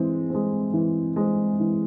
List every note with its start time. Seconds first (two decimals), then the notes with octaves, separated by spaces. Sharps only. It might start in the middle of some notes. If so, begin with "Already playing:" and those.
Already playing: E3 G#3 C4
0.30 G#3 C4
0.73 E3
1.16 G#3 C4
1.59 E3